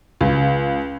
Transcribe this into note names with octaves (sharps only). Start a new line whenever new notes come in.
C#2